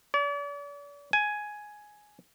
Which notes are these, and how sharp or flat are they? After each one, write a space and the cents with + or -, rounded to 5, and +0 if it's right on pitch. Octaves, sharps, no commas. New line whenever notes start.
D5 -45
G#5 +10